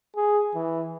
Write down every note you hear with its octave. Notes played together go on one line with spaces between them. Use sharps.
G#4
E3